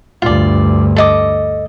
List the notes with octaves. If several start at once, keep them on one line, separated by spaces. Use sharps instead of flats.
D2 G2 F4 D5
A4 D#5 D6